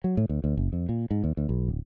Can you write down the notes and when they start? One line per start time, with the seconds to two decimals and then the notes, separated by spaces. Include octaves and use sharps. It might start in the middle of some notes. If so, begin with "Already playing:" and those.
0.04 F#3
0.17 A2
0.29 D2
0.44 D2
0.57 F#1
0.73 F2
0.89 A#2
1.11 G#2
1.24 D#2
1.37 D2
1.49 B1
1.68 D1